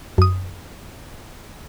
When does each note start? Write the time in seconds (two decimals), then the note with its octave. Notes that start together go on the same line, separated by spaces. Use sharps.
0.18 F#2 D#6